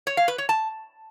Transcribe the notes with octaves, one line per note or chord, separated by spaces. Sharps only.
C#5
F5
B4
C#5
A5